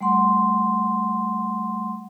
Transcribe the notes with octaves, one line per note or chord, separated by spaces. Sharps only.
G3 A3 F#5 C6